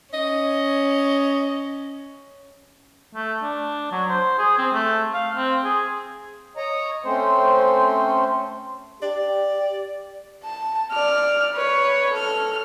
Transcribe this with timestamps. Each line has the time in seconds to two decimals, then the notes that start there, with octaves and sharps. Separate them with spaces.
0.14 C#4 D#5
3.15 A3
3.43 D4
3.92 F#3
4.09 C5
4.39 G#4
4.58 C4
4.73 A3
5.14 F5
5.35 C4
5.64 G#4
6.57 C#5 D#5 A#5
7.05 A3 C4 C#4 C5
9.03 G4 D5
10.44 A5
10.92 D5 F6
11.54 B4 C#5
12.13 A4 F6